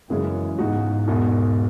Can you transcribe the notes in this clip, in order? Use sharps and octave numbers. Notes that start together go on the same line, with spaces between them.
F#2 C#3 E3 G#3 C#4 G#4
C#2 G#2 B2 G#3 D#4 F#4
E1 E2 B2